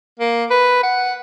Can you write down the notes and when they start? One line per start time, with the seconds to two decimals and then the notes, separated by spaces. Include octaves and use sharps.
0.20 A#3
0.51 B4
0.83 F#5